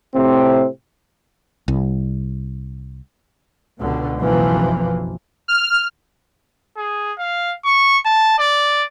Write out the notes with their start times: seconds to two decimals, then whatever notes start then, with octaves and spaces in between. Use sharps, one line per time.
0.14 A2 C3 C4
1.68 C2
3.80 C#2 B2 D3
4.19 F#1 B1 F2 E3 F3 A#3
5.48 F6
6.77 G#4
7.18 F5
7.65 C#6
8.05 A5
8.38 D5